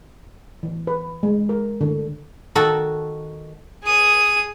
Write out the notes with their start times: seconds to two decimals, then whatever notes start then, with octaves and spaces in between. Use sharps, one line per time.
0.63 E3
0.87 B4
1.23 G#3
1.49 A#4
1.81 D3
2.55 D#3 F#4 A4 A#5
3.83 G#4 D#6